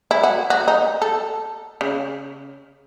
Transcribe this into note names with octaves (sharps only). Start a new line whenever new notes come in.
E4
F#4
F#4
D#4
A4
C#3